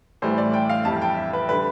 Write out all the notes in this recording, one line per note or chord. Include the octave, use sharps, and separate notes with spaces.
A2 E3 G3 C5
D5
G5
F5
F2 E3 G3 A5
G5
E5
B4
D3 G3 B4